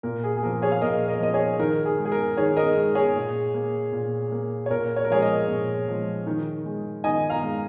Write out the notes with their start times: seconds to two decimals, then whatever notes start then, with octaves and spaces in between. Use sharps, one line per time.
0.03 A#2 A#4
0.24 G#4
0.37 G#4
0.43 F3 A#3 A#4
0.62 G#4 C#5
0.72 F5
0.81 A#2 A#4 D#5
1.07 A#4 D#5
1.20 F3 A#3 D#5
1.34 G#4 C#5
1.59 D#3 A#4
1.85 G#4
1.98 G#3
2.05 G#4
2.12 A#4
2.37 D#3 G#4 C#5
2.57 A#4 D#5
2.76 G#3
2.95 G#4 C#5
3.16 A#2
3.54 A#3
3.92 A#2
4.32 A#3
4.66 C#5
4.70 A#2 A#4
4.96 C#5
5.04 A#4
5.10 F3 G#3 G#4 C#5
5.22 A#4 D#5
5.49 A#2
5.88 F3 G#3
6.27 D#3
6.65 G#3
7.04 D#3 D#5 G#5
7.30 F5 A#5
7.43 G#3